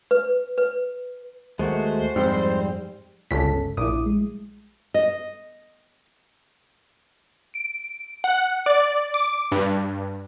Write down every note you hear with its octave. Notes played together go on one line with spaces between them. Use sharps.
B4
B4
D#2 G#3 A3 F#4 C5
F2 G#2 G3 C4
G1 C#2 C#4 A4 B6
A#1 E4 D6 D#6
G#3
D#5
D7
F#5
D5
D6
G2